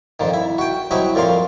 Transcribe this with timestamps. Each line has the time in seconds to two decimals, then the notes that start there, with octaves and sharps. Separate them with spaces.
0.20 F2 A#2 D#3
0.33 E4
0.58 F#4 G5
0.91 F#3 C4 E4 F#4 D#5
1.15 F2 A#2 A#4 F5 C6